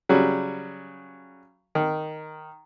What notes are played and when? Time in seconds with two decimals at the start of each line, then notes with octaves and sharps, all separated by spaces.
0.09 C#3 F#3 G3
1.75 D#3